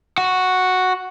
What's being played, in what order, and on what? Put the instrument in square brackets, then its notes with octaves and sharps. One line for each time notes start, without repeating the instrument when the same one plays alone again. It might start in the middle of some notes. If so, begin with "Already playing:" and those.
[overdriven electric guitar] F#4